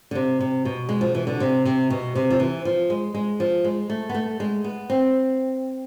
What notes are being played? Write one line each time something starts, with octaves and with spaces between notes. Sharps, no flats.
D3
C3
C3
B2
G#3
F3
E3
D3
C3
C3
B2
C3
F3
E3
F3
G#3
G#3
F3
G#3
A3
B3
A3
G#3
B3
C4